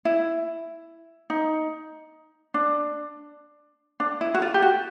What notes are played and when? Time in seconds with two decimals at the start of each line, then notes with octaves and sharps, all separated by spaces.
0.05 E4
1.30 D#4
2.54 D4
4.00 D4
4.21 E4
4.34 F#4
4.42 F4
4.54 G4
4.62 F#4